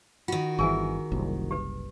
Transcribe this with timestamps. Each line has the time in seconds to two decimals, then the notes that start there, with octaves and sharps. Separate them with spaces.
0.28 D#3 F4 F#4
0.59 G1 B2 E3 G#4 A#4 G#5
1.12 F#1 C2
1.51 G4 B4